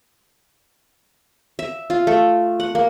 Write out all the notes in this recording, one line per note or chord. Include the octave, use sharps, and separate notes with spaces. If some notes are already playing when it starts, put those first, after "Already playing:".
E5
F4
A3
F#5
A#3